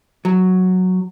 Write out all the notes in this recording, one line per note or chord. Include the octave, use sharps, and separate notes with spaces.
F#3